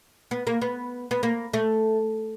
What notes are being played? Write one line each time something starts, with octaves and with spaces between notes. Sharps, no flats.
B3
A#3
B3
B3
A#3
A3